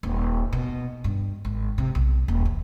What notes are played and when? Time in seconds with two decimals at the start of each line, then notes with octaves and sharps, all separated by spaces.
0.03 D#1
0.53 B2
1.04 G2
1.45 G#1
1.78 C3
1.95 B1
2.28 D#1
2.45 E3